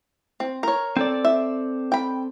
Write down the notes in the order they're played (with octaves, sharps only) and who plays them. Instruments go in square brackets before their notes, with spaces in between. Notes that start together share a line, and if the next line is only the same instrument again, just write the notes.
[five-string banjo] C4
A#4 C#5
[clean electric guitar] C4 A4 D5
[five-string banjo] E5
G5 B5